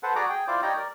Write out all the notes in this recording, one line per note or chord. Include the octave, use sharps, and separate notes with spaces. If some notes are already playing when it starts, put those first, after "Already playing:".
A4 B4 C5 F#5
F#4 G#4 D5 A#5 D6
G#4 G5
E4 F4 C5 D5 D6
D#4 G4 C#5 D5 G5 A#5
A#4 D5